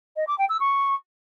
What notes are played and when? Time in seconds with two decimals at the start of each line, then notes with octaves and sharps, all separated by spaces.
0.16 D#5
0.27 D6
0.38 G5
0.49 E6
0.60 C#6